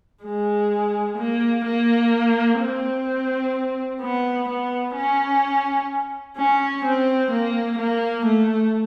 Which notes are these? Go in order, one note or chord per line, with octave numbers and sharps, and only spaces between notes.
G#3
A#3
A#3
C4
B3
B3
C#4
C#4
C4
A#3
A#3
A3